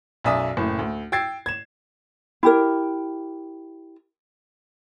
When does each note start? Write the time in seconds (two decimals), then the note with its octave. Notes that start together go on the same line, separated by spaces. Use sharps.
0.24 B1 F#2 D5 E5 G#5 D#6
0.57 F#1 A2
0.79 D2
1.12 G5 E6 G#6 A6 C7
1.46 G#6 E7
2.43 E4 G4 A#4